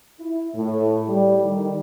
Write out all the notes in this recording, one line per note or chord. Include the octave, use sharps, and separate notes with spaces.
E4
A2
G3
D#3